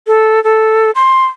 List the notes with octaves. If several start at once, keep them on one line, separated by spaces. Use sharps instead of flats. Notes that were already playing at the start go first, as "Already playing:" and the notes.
A4
A4
C6